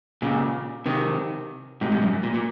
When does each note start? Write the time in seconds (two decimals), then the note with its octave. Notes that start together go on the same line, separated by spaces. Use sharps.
0.22 A#2 C#3
0.86 C3 D#3
1.81 G#2 C3
1.92 G#2 C3
2.02 F#2
2.23 A#2
2.34 A#2